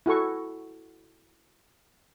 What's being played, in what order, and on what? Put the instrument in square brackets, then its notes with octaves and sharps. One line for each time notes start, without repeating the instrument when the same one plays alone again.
[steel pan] E4 F#4 A4 C#6